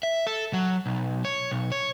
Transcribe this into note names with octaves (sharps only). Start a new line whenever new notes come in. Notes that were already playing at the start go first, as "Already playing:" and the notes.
E5
A4
F#3
B1
C#5
B1
C#5